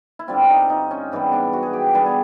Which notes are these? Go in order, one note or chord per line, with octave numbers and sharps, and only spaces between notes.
E4
G2 D3 G3 C4 F4
D4
D#4
D#4
C#4
G#2 E3 G3 B3
D4
F#4
G#4
G4
D3 G3 B3 G#4
G#4